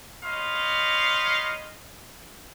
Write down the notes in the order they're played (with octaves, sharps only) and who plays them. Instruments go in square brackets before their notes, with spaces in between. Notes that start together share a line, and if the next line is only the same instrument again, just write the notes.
[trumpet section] D#4 C#5 D#5 F5 B5 C6